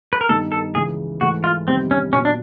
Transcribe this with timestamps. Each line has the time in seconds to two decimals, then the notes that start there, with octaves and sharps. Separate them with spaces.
0.13 B4
0.21 A#4
0.29 G2 D#3 G3 B3 D#4 A4
0.52 A4
0.75 C#2 C#3 E3 G#3 G#4
1.21 G#2 E3 A3 F#4
1.44 F4
1.67 F2 C3 D#3 G3 B3 C4
1.91 C#4
2.13 A#2 F#3 B3 C#4
2.25 D4